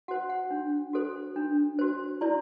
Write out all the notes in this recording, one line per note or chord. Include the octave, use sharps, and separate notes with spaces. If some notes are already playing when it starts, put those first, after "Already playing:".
F#4 C5 F#5
F#5
D4
F#4 A4 C5
D4
F#4 C5
E4 D5